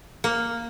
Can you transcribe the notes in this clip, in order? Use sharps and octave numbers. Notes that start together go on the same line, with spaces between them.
A#3